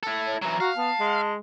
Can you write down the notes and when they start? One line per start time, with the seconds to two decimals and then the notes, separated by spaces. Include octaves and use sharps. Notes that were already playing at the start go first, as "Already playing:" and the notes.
0.03 E4 A4
0.26 C#5
0.42 E3 F#3 A#5
0.60 F#4 F5
0.77 B3 A5
1.00 G#3